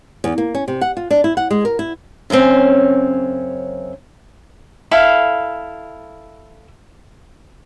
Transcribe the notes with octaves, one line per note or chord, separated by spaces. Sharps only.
E2
A#3
C#4
C3
F#5
F4
D4
E4
F#5
G#3
A#4
E4
F#2 C#3 A3 C4 C#4
E4 A4 F5